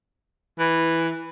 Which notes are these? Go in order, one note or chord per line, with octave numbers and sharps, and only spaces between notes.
E3